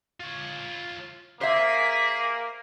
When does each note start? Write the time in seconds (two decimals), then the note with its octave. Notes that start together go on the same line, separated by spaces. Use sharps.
0.20 F4 C#5
1.41 A#3 G#4 C5 E5 B6